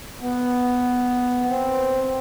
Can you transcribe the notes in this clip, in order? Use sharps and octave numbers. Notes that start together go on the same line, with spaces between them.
B3
C4